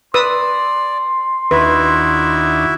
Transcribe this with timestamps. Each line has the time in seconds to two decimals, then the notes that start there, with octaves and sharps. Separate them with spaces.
0.14 B4 D5 C6 D#6 E6
1.51 D#2 D#3 D4 E4 F#4 B4 E5